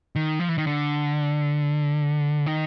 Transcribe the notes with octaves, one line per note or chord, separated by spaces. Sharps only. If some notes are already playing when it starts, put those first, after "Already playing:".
D#3
F3
E3
D#3
D3
D#3